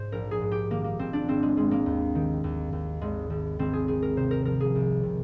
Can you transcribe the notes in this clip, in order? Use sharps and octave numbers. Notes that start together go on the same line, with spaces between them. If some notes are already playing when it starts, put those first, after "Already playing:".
Already playing: G#2 C5
A#1 A#4
G#4
G#2
G4
D#3 A#3
A#3
G#1 C4
D4
G#1 C4
G#3
G#1 G#3
A#3
D#2
D#3
D#2
D#2
G#1 G#3
G#1
G#1 C4
G#4
D#3 G#4
A#4
C3 C5
A#4
F3 A#4
G#4
C2
C3